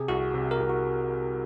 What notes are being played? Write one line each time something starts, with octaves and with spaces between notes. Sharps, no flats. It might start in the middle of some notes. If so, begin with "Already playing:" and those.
Already playing: C3 G#4
C2 F#4
C3
A#4
C2
F#4